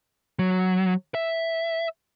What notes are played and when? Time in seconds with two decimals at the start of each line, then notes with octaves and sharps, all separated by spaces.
0.39 F#3
1.15 E5